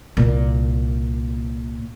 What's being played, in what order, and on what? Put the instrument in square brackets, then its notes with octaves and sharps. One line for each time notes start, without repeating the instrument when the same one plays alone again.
[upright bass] C2 A#2